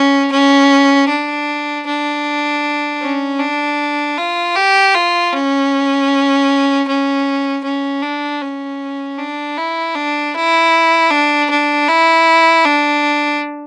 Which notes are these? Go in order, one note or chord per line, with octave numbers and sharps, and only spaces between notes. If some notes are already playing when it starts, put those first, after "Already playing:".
Already playing: C#4
C#4
D4
D4
C#4
D4
F4
G4
F4
C#4
C#4
C#4
D4
C#4
D4
E4
D4
E4
D4
D4
E4
D4